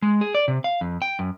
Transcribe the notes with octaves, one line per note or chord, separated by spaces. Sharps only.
G#3
G#4
D5
C3
F5
F2
G5
F#2